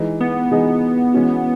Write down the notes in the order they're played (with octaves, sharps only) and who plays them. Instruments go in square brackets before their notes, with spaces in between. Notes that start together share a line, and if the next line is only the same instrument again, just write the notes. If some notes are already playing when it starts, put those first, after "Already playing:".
Already playing: [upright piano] E3 G#3 D#4 G#4
[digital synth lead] B3
[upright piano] E3 G#3 D#4 G#4
E3 G#3 C#4 F#4